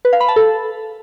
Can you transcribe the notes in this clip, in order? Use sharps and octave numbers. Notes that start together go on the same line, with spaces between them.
B4
F5
B5
A5
A4